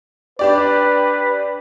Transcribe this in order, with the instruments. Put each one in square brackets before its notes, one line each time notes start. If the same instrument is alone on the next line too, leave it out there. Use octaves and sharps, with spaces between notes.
[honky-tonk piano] D4 G4 D5 [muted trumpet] B4